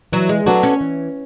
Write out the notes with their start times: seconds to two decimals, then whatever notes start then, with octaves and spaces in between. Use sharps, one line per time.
0.13 E3 F#3
0.29 G#3
0.46 F#3 B3 D4 F#4 A4
0.63 C#4
0.81 E3